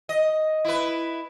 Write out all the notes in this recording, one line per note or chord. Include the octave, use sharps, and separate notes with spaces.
D#5
E4 B4